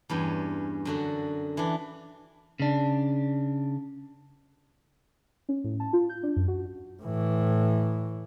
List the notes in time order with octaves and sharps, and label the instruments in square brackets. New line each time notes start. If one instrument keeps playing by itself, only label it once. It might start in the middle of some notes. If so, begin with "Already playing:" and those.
[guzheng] E2 G2 C#4 G5
F#2 D3 F#4
E3 D4
[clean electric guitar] C#3 D4
[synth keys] C#4
A2
A5
F4
G6
D4
F#2
F#4
[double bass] A2 E3